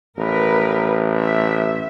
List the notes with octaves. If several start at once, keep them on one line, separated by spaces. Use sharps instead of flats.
A1 A#4 B4
E5